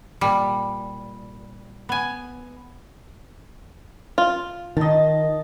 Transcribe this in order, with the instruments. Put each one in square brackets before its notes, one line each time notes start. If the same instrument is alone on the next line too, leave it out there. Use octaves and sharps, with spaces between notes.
[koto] A#2 G3
B3 G#5
[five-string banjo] F4
[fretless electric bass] D#3 [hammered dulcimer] D#5 A5